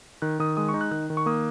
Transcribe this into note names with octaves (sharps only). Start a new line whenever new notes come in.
D#3 F#6
D#3 D#6
G#3 D#6
C#6
D#4
F#6
D#3 F#6
D#3
C#6
A#3 D#6